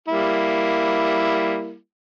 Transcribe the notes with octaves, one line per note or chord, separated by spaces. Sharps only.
G3 A#3 E4